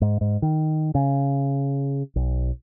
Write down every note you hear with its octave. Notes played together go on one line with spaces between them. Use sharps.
G#2
G#2
D#3
C#3
B1